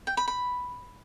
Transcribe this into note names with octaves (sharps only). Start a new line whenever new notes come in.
G5
B5
B5